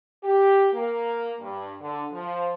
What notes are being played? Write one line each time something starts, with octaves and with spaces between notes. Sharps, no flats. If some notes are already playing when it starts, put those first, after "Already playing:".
G4
A#3
G2
D3
F3